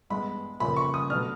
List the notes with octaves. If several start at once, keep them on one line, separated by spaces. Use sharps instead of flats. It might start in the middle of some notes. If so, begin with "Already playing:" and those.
G2 E3 G#3 B3 B5
F2 C#3 F3 A#3 C#4 B5
C#6
D#6
B2 F#3 A3 D4 F6